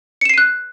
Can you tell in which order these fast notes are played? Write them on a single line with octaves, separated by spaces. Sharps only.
C#7 E7 C7 D#7 F#6